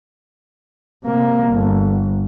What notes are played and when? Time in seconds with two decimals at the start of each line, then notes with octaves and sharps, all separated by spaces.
1.04 C3 A#3
1.48 G1